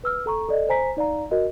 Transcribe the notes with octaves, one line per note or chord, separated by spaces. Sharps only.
B4 E6 F6
A4 A#5 C#6
A4 D5 D#5
C5 G#5 A#5 B6
D#4 D5 F5 A#5
F#4 A#4 D#5